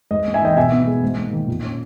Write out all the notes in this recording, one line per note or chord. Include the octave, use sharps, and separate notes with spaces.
G#2 D#5
A#3
E5 G#5
E3 D#5 G5
B2 E5 G#5
B3
G#3
G#2
A#3
D#3
A#2
C#4